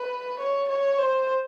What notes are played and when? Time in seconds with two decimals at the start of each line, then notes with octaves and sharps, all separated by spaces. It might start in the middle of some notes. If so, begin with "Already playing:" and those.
Already playing: B4
0.39 C#5
0.69 C#5
0.98 C5